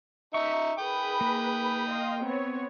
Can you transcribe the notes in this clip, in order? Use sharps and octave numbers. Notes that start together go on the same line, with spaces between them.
D#4 E5 C#6
G#4 B4 G5 B5 D#6
A#3
D#5 F5 C6
B3 C4 C#5